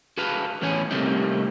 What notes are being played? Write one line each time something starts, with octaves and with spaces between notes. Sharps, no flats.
F#4 G#4 A4 B4 F5
A2 E3 B3 C#4 C#5 G#5
C3 G3 A3 A#3 C4 D#4